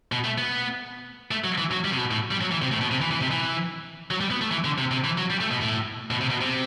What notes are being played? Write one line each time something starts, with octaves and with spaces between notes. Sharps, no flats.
B2
A3
B3
A3
F#3
E3
F#3
G3
C3
B2
A2
G3
F#3
E3
C3
A2
B2
C3
E3
E3
C3
E3
F#3
G3
B3
A3
E3
D3
C3
C3
E3
F#3
G3
A3
B2
A2
B2
C3
B2
C3